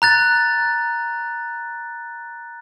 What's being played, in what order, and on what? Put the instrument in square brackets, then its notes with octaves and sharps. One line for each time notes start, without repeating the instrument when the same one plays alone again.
[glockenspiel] A#5 F#6 A6